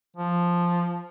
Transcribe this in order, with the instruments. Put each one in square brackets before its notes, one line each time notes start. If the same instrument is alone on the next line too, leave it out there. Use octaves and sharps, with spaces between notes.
[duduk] F3